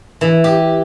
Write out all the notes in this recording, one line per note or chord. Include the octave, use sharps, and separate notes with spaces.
E3
G4